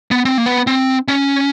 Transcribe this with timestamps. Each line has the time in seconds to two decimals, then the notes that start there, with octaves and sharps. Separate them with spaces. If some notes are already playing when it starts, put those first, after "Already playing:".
0.11 B3
0.25 C4
0.38 A#3
0.46 B3
0.67 C4
1.08 C#4